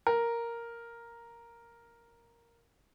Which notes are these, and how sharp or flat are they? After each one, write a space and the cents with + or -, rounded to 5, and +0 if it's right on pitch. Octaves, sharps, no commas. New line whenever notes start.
A#4 +0